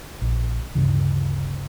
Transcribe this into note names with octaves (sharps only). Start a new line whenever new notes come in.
A#1
D2 G2 C#3 E3